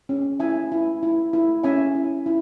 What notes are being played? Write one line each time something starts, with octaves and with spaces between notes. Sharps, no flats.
C#4
E4 E5 G#5
E4
E4
E4
C#4 E5 G#5
E4
E4